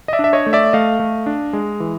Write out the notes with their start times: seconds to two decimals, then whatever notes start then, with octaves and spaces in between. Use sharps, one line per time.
0.08 D#5
0.13 D5 E5
0.19 D4
0.24 E5
0.33 C#5 D#5
0.46 A3
0.53 D5 E5
0.73 A3 D#5 F5
0.99 A3
1.26 D4
1.53 G#3
1.80 E3